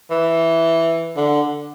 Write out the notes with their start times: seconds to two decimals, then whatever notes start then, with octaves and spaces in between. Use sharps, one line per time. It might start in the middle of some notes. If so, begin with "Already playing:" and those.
0.11 E3
1.16 D3